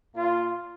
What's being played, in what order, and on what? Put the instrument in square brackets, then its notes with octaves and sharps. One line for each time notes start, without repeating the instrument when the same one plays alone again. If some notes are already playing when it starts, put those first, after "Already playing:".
[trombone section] A#2 A#3 F4